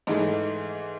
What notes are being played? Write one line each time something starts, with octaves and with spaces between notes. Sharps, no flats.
G#2 E3 A3 D#4